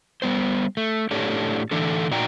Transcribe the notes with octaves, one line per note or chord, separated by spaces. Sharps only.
G3 B3 C5
A3
A2 D4 G4 A4 C#5
D3 E3 A3 D4 A4
A#2 D#4 F#4 D5 G5 A#5